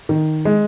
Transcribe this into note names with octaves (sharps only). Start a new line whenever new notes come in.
D#3
G#3